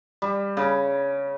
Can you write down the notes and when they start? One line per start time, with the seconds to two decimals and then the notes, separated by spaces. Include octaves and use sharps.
0.22 G3
0.57 C#3